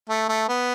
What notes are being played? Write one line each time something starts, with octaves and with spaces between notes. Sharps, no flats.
A3
A3
B3